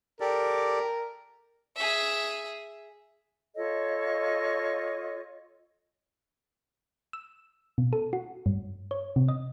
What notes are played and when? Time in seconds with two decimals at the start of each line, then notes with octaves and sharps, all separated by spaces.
0.20 G4 A4 A#4 D5
1.77 G#4 E5
3.55 F4 A4 C#5 D#5
7.13 E6
7.78 B2
7.93 A4
8.13 F#4
8.46 G2
8.91 C#5
9.16 C3
9.28 D#5